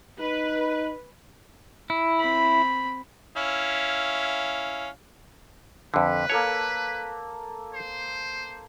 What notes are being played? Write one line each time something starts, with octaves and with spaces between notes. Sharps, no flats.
D#4 B4
E4
C4 B5
C#4 E4 F5
F2 D3 B4
A#3 A4 C#5 A5
C5